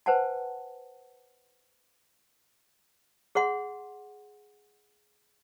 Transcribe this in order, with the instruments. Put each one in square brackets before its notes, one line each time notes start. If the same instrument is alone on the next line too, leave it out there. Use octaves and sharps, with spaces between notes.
[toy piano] B4 C5 F#5 G#5 A5
G#4 C#5 F#5 C6